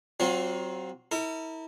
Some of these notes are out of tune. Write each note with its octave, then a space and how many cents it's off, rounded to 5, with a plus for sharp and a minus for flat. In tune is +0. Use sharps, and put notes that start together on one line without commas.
F#3 +30 C4 +0 F4 +45
E4 -35 A#4 -40